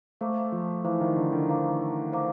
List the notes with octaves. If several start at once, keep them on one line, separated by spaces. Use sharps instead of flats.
A3 C5 F5 A#5 D6
F3
E3 C5 F5 A#5 D6
D#3
D3
D#3
C5 F5 A#5 D6
C5 F5 A#5 D6